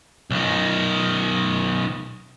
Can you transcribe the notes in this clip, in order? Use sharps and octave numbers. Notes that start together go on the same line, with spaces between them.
B1 D#3